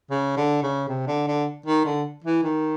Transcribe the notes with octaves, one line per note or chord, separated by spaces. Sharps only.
C#3
D3
C#3
C3
D3
D3
D#3
D3
E3
D#3